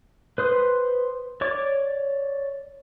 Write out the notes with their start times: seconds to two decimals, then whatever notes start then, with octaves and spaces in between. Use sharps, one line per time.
0.38 B4 C5 D#6
1.41 C#5 D5 D6